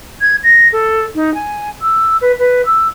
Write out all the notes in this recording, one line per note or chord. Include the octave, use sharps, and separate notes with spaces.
G#6
A#6
A4
D#4
G#5
E6
B4
B4
E6